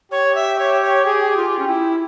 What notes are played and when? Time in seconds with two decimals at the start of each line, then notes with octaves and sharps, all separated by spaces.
0.11 G4 C#5
0.35 E5
0.59 C#5
0.82 C#5
1.05 G#4
1.37 F4
1.59 C#4
1.67 E4